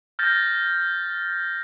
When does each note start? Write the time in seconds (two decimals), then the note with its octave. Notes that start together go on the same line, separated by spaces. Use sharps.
0.19 F6 G6 A6 A#6